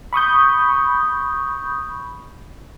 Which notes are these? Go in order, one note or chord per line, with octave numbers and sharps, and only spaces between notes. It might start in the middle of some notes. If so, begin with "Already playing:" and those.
B5 C#6 D#6 G6